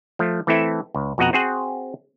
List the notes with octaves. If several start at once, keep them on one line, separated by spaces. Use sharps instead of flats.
F3 A3
E3 A3 C4 E4 A4 E5
C#2
F2 B2 F#4 D#5 F#5 A#5
C4 F#4 G#4 C5 F#5